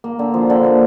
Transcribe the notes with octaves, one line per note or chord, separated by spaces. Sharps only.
A#3
D3
F3
D3
A#3